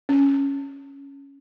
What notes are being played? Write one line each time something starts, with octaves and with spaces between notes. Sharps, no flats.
C#4